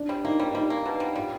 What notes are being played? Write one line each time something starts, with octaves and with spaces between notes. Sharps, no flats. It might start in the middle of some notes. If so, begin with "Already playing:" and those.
Already playing: D4
G3
A#3 D#4
G3
G3 D#4
A#3
B2
G3
G3 F4